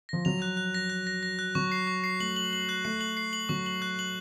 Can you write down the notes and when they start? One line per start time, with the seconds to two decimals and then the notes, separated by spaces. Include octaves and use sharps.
0.09 F3 A#6
0.25 F#3 F7
0.42 F#6
0.57 F#6
0.74 A#6
0.90 F#6
1.07 A#6
1.23 A#6
1.39 F#6
1.55 F#3 C#6
1.72 C7
1.87 C#6
2.04 C7
2.20 A3 F#7
2.36 F#7
2.53 F#7
2.69 F#6
2.85 A3 C7
3.01 F#7
3.17 C7
3.33 F#7
3.49 F#3 C#6
3.66 F#7
3.82 F#6
3.99 F#7